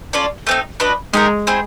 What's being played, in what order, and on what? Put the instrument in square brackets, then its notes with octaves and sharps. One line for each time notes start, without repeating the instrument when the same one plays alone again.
[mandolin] C#4 F4 A4 D5
A3 C4 D#4
D4 F#4 B4 D#5
[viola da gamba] G#3 [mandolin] D#4 G4 A#4
[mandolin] C4 E4 G#4 C5